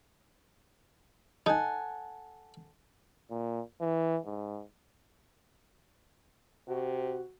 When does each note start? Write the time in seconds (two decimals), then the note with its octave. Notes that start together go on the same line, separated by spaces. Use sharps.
1.46 D#4 A4 F#5 G#5
3.31 A#2
3.81 E3
4.25 G#2
6.68 C3 F#4